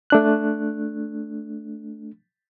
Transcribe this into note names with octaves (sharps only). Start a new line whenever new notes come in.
A3 D4 F#6